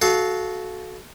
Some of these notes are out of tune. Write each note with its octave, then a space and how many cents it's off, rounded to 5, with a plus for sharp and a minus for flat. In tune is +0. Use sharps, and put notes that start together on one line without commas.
F#4 +0 A4 -20 F5 +0